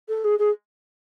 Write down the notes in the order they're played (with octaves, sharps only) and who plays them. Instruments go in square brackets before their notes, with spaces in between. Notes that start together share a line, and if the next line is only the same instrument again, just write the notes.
[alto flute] A4
G#4
G#4